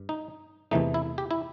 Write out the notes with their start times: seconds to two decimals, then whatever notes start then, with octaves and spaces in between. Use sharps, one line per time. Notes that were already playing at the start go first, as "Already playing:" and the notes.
Already playing: G2
0.09 D#4
0.71 E2 C3 E3 A3 D#4
0.94 E4
1.18 G4
1.31 E4